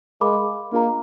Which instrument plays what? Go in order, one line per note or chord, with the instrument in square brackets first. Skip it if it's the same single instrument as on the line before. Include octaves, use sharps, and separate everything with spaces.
[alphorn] G#3 [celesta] A#4 F5 B5 D6
[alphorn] A#3 [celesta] D4 F4 G#4 D#5 A#5